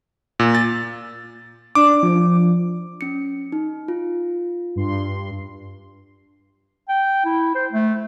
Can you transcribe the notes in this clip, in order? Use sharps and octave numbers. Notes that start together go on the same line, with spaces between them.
A#2
A6
D4 D6
F3
C#4 C#7
D#4
F4
G2 C6
G5
E4
C5
A3